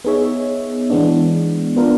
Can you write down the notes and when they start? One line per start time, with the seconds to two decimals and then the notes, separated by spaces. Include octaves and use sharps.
0.04 B3 D#4 G#4 C#5 E5
0.90 E3 G#3 B3 D4
1.76 B3 D4 F4 A#4